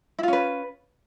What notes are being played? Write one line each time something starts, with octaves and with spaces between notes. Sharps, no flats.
C#4 E4 F4 B4